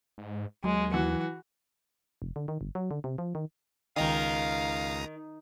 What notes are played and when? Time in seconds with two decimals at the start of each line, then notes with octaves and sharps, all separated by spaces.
0.18 G#2
0.64 D#2 F#3 G#3
0.94 E3 F#4
2.22 F1
2.36 D3
2.48 D#3
2.61 G1
2.75 F#3
2.91 D3
3.04 C3
3.18 F3
3.35 D#3
3.96 C#2 D#3 F5 A#5 D#6